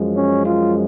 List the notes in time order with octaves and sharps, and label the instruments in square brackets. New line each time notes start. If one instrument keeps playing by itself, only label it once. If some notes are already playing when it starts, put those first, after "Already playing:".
Already playing: [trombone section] F#2 F3 G#3
C#4
F4